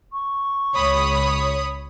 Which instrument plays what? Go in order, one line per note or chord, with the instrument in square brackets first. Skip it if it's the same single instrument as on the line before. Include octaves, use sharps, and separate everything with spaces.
[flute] C#6
[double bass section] C#2 [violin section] C#5 B5 D#6